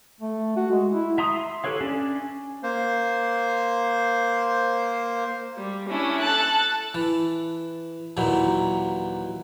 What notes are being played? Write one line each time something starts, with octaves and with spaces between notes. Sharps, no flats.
A3
F#4
G#3
E4
E5 A#5 C6 D#6
G4 A4 B4 C#5 F5
C#4 D4 D5
A#3 C5
G3
C#4 D4 E4
A4 A5 F#6
E3
D#2 A#2 E3 F#3